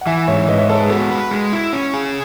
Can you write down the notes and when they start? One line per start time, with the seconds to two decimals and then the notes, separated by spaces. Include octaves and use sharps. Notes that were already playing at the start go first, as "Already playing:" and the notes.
0.01 F#5
0.07 E3 E5 G#5
0.28 G#2 C#5 E5
0.48 G#2 B4 D#5
0.58 C#5 E5
0.69 G#3 A4 C#5
0.79 G#4 B4
0.90 B3 F#4 A4
1.11 B4
1.31 G#3
1.53 E4
1.73 C#4
1.94 G#4